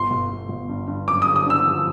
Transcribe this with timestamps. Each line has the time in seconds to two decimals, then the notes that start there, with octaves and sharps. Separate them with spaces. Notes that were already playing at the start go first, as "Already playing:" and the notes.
Already playing: G1 C6
0.11 G1
0.29 G1
0.49 G1
0.69 G2
0.87 G2
1.08 F#2 D6
1.22 D3 D#6
1.36 D#6
1.46 D3 E6
1.65 F3